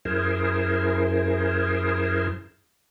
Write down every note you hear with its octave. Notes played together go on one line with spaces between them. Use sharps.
F#2 E4 G#4 A#4 C5